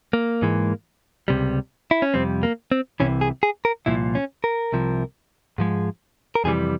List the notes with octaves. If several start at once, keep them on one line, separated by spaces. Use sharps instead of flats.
A#3
G#2 E3 G#3
C#2 C3 G3
E4
C#4
F2 C3 G3 C4
A#3
C4
C2 C3 E3 C#4
G#4
G#4
A#4
C2 A#2 F3 E4
C#4
A#4
C2 C3 F3
G#2 F3 G#3
A#4
F2 C3 E3 G3 G#4